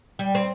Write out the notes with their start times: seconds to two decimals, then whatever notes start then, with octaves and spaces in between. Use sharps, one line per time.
0.19 G3
0.35 C4